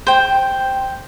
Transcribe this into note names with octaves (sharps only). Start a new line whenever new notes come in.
C5 G5